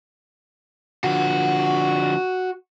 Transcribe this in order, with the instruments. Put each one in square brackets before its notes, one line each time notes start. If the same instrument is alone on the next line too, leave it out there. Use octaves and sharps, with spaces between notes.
[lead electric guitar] D3 F3 [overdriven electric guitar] F#4